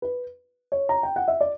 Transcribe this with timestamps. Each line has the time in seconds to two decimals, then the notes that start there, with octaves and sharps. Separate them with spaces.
0.02 B4
0.72 C#5
0.89 A#5
1.03 G5
1.16 F#5
1.28 E5
1.41 D5